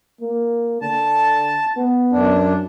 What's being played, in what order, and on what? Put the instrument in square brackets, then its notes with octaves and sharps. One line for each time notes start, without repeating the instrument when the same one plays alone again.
[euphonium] A#3
[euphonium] D3 [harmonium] A5
[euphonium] B3
[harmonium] F#2 D4